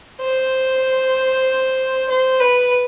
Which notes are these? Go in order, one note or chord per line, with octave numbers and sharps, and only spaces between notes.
C5
C5
B4